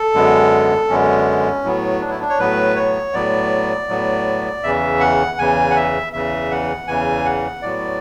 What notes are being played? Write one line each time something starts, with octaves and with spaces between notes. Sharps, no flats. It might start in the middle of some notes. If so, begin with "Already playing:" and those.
Already playing: A4
F#2 D3 G#3 B3
F#2 D3 G#3 B3 C#4
A2 F#3 B3
D4
E4
D4
C#5
A2 F#3 B3 B4
C#5
A2 F#3 B3 D5
A2 F#3 B3
E2 C#3 E3 E5
F#5
E2 C#3 E3 G#5
F#5
E5
E2 C#3 E3 E5
F#5
E2 C#3 E3 G#5
F#5
A2 F#3 B3 D5